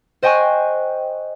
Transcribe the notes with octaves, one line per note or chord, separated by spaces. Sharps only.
C5 D#5 G5 G#5 C#6 F#6